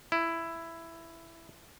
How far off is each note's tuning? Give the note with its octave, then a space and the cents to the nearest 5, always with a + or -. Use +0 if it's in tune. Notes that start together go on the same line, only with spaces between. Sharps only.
E4 +10